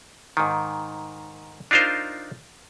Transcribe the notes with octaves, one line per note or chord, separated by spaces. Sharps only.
G#2 D#3
D4 D#4 F4 A#4 C5